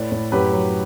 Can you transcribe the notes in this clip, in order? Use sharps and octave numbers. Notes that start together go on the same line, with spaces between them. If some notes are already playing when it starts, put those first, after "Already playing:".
Already playing: A2 B4 D5
A2
F#2 G4 B4
F#3